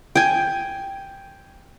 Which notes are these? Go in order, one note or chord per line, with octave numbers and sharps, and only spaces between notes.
G5 G#5